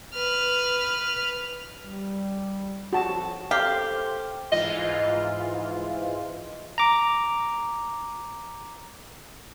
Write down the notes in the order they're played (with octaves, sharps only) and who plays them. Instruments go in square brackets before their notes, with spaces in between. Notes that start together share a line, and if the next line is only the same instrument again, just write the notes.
[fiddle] B4 F6
[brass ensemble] G3
[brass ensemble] F2 C#5 [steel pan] F#4 A5
[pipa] G4 [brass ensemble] A4 C5 [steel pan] F5
[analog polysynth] G#2 E3 F4 [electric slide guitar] D#5
[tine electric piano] A#5 D6